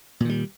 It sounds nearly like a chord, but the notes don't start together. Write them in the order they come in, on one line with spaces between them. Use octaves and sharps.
A#2 D#3 G3